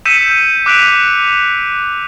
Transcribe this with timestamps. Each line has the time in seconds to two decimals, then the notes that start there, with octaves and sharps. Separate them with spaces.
0.05 E6 G6 B6 C#7 D#7 E7
0.66 D6 F#6 B6 D7 F7